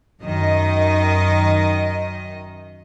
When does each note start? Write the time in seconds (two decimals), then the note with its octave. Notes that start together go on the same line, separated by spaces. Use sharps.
0.21 F#2 D#3 D#5